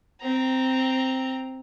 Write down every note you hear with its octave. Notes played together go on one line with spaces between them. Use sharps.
C4 A#5